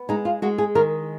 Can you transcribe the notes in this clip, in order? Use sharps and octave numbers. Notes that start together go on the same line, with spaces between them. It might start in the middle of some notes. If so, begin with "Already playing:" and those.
Already playing: B3
G#3 D#4
F4
G#3 F#4
G#4
D#3 A#4